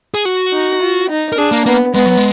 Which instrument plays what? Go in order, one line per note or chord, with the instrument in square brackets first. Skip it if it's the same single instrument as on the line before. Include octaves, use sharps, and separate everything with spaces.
[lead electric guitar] G#4
F#4
[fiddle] D#4
F4
D#4
[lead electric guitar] A#4
[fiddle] D4 [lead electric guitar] G#4
[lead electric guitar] A#3
[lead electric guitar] A#3 [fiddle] B3
[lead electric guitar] G#3 [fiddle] B3
[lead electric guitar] F#3
G#3